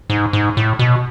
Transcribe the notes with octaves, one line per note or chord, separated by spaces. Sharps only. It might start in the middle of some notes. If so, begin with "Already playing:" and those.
G#2
G#2
A2
B2